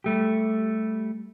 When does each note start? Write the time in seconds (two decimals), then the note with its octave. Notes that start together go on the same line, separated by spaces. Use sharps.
0.04 G3 A3 G4